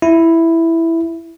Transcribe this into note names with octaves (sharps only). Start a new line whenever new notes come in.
E4